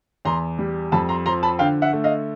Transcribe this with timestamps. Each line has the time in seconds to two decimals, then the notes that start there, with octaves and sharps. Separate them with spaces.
0.25 E2 A#5 C6
0.58 G3
0.92 F2 A5 B5
1.09 A#5 C6
1.26 F3 A#5 C6
1.43 A5 B5
1.59 D3 F5 G5
1.82 E5 F#5
1.93 A3
2.04 D#5 F5